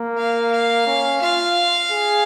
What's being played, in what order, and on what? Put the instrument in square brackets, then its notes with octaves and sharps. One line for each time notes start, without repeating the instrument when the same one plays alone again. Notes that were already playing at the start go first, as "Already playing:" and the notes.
Already playing: [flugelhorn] A#3
[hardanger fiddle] F5
F5
[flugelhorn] C#4
[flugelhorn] F4 [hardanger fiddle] F5
[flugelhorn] G#4